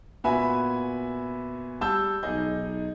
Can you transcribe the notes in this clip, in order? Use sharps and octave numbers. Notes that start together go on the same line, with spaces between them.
A#2 B3 F#4 E5 G#5 B5
G3 A5 E6 G6
B1 D#4 G#4 D#5 G6